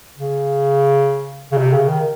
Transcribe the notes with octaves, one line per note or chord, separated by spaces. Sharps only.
C#3
C#3
C3
C#3
D#3